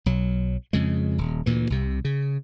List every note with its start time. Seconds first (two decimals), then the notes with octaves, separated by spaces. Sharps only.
0.06 B1 F#3
0.73 F2 C#3 G#3
1.18 D#1
1.46 D2 A#2 E3
1.70 C2 C3
2.05 C#3